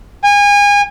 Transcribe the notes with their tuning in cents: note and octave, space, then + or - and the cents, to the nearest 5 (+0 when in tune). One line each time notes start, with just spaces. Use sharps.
G#5 -30